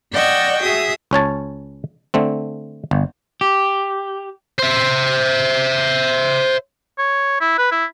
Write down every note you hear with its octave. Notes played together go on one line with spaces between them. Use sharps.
D5 D#5 F#5 G5 C#6 E6
F#4 G#4 E5 D#6
C#2 C#4 C#5 A5
D3 A3 C4
G1
G4
C5 E5
C#5
E4
B4
E4